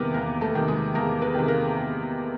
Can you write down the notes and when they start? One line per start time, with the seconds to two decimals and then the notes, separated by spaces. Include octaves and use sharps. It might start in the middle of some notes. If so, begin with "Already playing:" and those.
Already playing: E2 C3 D#3 G3 A#3 B3 A#4 B4
0.14 E2 A#3 A#4
0.41 A3 A4
0.55 C3 D#3
0.68 G#3 G#4
0.95 E2 A#3 A#4
1.22 B3 B4
1.35 C3 D#3
1.48 A#3 A#4